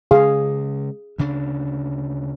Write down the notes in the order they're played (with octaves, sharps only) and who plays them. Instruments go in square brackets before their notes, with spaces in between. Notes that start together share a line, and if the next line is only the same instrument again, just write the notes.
[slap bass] C#3 G#3 [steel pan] G#4 F5
[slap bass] D2 C#3 D4